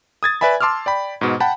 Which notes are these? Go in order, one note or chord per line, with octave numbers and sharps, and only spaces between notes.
D#6 G#6 A6
B4 D5 E5 G#5 B5
A5 C6 D6 E6 F6
D5 G5 B5
G#2 B2
F#5 G5 A5 B5